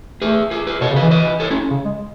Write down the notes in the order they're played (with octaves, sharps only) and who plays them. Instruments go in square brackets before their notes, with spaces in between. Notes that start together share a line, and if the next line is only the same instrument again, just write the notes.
[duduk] A3 [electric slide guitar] G#4 B4
[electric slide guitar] G#4 B4
G#4 B4
[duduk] B2 [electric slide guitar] A4 C#5
[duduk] C#3
[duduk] E3 [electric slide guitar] B4 D#5
[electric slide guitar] B4 D#5
A4 C#5
C#4 E4
[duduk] C#3
G#3